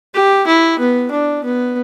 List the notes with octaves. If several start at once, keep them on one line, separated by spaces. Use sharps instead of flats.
G4
E4
B3
D4
B3